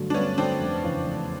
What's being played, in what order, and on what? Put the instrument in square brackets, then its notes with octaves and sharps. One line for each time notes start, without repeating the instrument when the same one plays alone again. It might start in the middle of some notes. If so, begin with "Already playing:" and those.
Already playing: [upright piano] G2 D3 F#3 A3
[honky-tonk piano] D4
[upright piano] G2 [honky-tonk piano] B3 C#4
[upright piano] D3 F#3 A3 [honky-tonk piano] C4 D4
[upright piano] F1
E2 C#3
F1